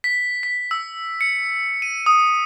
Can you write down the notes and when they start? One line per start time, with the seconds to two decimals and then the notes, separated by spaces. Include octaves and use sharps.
0.04 B6
0.43 B6
0.71 E6
1.21 C#7
1.82 D#7
2.06 D#6